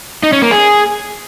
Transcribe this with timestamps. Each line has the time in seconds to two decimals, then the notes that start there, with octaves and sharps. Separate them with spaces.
0.23 D#4
0.33 C#4
0.42 A#3
0.51 G#4